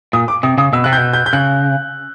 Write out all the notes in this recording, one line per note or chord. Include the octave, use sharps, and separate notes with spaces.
A#2 D#6
D6
C3 D#6
C#3 D#6
B2 E6
C3 F#6
G6
B2
G6
G6
C#3 F#6